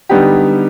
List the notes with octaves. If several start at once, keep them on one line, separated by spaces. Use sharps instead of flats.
D3 G3 B3 D#4 G4